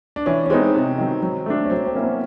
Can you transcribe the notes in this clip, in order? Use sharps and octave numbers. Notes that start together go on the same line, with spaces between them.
D4
E3 C#4
C#4
G#3 B3 C4 D#4
C3
D#3 F#3
F#3
A3 D4
C#4
F#3 C4
C4
A#3 C#4 E4
B3